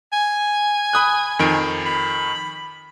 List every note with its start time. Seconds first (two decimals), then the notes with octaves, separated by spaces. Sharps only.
0.13 G#5
0.93 B5 D#6 F#6
1.39 F2 D#3 D7
1.86 B5